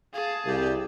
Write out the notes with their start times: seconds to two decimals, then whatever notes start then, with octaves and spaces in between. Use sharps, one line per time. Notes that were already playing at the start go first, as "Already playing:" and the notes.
0.14 G#4 F5 A5
0.46 C2 G4